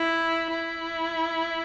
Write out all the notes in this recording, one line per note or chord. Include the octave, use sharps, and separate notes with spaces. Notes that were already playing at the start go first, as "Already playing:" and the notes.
Already playing: E4
E4